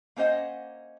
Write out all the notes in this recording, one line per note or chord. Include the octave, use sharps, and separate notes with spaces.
A#3 C#4 C5 D#5 F#5